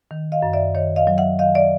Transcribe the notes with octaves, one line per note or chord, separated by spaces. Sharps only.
D#3
D#5 F5
F#2
D5 E5
D#3 C#5 D#5
D#5 F5
F#3
E5 F#5
D#3 D#5 F5
D5 E5